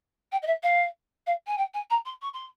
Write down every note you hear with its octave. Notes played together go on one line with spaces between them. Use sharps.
G5
D#5
E5
F5
F5
G#5
G5
G#5
A#5
C6
C#6
C6